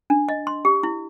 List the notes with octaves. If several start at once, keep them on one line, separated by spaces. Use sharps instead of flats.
D4
D#5
C6
G4
E4